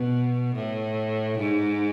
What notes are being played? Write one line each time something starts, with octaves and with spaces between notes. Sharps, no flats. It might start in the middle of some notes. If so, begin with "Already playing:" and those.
Already playing: B2
A2
G#2